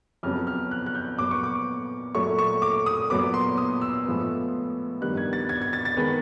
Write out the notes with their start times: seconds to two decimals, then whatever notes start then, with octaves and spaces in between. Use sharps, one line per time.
0.23 F2 C#3 F#3 B3 F6
0.47 F6
0.71 F#6
0.86 F#6
0.95 G6
1.19 A#2 F#3 B3 D6
1.31 C#6
1.43 D6
2.14 A#2 F#3 A3 C#6
2.38 C#6
2.62 D6
2.86 D#6
3.10 A#2 F#3 B3 D6
3.34 C6
3.58 D#6
3.81 E6
4.06 A2 F3 G#3 B3
5.01 G2 D#3 G3 B3 F#6
5.17 G#6
5.33 A6
5.49 G#6
5.62 G#6
5.73 A6
5.85 A6
5.97 D#3 G#3 B3